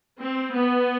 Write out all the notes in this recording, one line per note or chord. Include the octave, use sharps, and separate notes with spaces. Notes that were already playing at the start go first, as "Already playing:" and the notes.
C4
B3